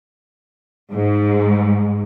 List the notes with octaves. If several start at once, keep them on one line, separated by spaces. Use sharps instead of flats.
G#2